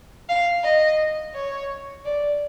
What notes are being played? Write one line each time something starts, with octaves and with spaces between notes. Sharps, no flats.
F5
D#5
C#5
D5